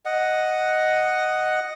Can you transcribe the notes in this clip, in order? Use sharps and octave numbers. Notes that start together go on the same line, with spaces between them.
D#5 F#5